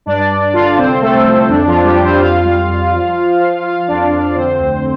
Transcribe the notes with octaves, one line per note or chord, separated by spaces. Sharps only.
G2 D4 D5
G2
D3 F4 F5
C2 C4 C5
C2 A3 A4
F3
F2 D4
F3 F4
F2
G3 G4
F3
C4 C5
F2 F4 F5
G3
F2
F3
F3
F3
F3 F4 F5
F2 D4 D5
F2 D4 D5
D5
D3 C4 C5
D2